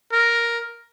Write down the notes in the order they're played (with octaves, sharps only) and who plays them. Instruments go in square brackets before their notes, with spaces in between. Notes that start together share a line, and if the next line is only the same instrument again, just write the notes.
[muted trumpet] A#4